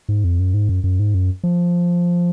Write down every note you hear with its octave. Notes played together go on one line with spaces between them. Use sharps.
G#2
F2
F#2
G#2
F#2
F#2
G#2
F#2
F3